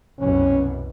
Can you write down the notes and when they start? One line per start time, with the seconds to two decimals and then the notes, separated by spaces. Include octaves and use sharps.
0.20 C2 F#2 B2 C#4